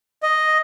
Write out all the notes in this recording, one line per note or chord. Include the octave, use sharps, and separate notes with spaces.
D#5